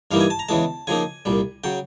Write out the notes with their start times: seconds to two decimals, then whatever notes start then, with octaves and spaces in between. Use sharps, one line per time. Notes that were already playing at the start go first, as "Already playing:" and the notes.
0.11 G2 E3 G3 A#3 D#4 F5
0.21 G#5
0.30 A5
0.39 A#5
0.49 E2 C#3 E3 G#3 A5
0.87 C#3 F3 A#3 D#4 G#5
1.25 C2 A#2 G3
1.64 C#3 F#3 G5